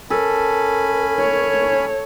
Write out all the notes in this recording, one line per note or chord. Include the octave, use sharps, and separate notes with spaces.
C#4 A4 A#4 G#5 B5
C#5